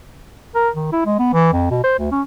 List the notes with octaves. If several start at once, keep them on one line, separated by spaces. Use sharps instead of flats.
A#4
D#3
E4
G#3
B3
E3
F2
B2
C5
D2
C#4